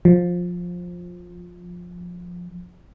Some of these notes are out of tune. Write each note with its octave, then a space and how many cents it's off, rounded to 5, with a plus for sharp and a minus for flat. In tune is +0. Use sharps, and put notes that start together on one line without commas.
F3 +15